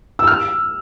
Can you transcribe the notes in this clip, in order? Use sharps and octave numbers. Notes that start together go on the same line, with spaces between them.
E6
F6